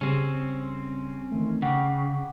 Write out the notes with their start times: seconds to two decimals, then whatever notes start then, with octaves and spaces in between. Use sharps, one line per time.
0.01 C#3 G3 C4 C#4
1.31 D#3 E3 A3
1.62 C#3 F#5 G5 D6